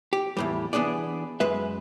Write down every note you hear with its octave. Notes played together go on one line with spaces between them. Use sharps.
G4
E2 A2 G3
E3 B3 D4 G#4 D5
F#2 G#3 B4 E5